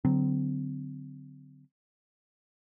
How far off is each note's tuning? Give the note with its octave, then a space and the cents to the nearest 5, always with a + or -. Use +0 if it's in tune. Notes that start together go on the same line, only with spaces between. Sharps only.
D3 -15 F#3 +5 C4 -30